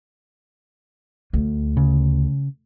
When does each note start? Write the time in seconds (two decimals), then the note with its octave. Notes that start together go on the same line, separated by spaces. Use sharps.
1.33 D2
1.77 C#3